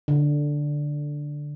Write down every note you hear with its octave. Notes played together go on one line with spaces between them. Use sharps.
D3